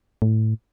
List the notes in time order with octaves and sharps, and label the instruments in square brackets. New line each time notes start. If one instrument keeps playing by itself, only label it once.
[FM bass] A2